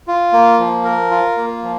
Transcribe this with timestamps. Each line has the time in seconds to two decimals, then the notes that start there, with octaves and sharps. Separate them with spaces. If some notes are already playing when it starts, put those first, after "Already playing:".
0.08 F4
0.33 A#3
0.59 F3
0.85 A#4
1.11 F4
1.37 A#3
1.63 F3